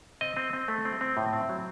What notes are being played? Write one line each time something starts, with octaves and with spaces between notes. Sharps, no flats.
C4 D#5
C4
C4
A3
C4
C4
A2
C4
F#3